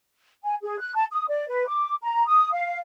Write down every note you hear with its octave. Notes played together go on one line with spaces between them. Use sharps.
G#5
G#4
F#6
A5
D#6
D5
B4
D6
A#5
D#6
F5